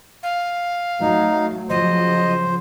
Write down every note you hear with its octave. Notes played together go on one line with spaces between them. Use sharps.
F5
F#3 A3 D#4
C#3 F3 F#3 C5 D#5